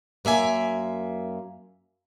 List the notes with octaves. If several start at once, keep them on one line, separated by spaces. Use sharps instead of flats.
F#2 A#3 E5 G#5